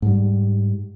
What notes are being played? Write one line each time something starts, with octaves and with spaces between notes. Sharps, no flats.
G#2 G3